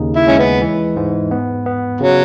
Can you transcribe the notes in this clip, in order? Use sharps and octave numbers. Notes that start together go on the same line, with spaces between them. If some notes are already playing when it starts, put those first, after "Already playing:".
Already playing: D#2 C#3 D#4
E4
G#3 C#4
B3
E3
G#2
B3
B3
C#3 F#3